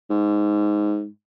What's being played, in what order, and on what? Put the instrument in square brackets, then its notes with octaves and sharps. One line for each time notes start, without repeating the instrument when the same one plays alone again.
[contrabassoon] G#2